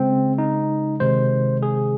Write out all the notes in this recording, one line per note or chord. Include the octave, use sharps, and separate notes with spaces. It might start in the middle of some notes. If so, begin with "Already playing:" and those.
Already playing: C#3 G#3 C4
D#4
C3 D#3 G#3 C5
G#4